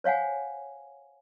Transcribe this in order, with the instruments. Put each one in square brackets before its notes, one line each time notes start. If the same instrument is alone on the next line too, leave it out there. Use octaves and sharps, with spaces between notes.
[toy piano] C5 C#5 F5 F#5 G#5